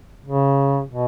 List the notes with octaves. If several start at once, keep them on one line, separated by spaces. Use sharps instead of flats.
C#3
B2